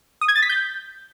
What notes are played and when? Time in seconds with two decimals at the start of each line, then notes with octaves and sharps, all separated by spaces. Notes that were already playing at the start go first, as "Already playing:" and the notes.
0.21 D#6
0.28 G#6
0.35 A6
0.42 B6
0.49 G6